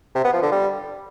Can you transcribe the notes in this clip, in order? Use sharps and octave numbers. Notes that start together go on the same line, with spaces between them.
C3
B3
F3
D3
G3